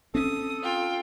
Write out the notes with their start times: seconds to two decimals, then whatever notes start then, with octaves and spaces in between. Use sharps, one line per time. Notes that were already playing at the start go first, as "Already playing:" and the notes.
0.15 C4 C#4 A4 D#6
0.63 F4 G5